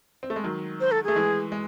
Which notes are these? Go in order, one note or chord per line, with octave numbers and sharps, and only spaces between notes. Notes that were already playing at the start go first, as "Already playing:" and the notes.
C4
A3
G#3
D#3 F#3
C5
A4
A3 G#4
E3 G#3
G#3